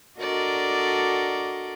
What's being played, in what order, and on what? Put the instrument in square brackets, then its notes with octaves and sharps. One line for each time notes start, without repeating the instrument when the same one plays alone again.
[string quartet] D4 F#4 A4 A#4 D5 D#5